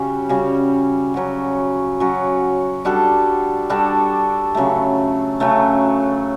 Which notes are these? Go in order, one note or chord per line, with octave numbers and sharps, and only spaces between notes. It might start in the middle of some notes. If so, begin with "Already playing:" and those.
Already playing: C#3 G3 C#4 F#4
C#3 G3 C#4 F#4
F#3 C#4 F#4
F#3 C#4 F#4
G3 D4 F#4 A4
G3 D4 F#4 A4
C#3 F#3 A3
C#3 F#3 A3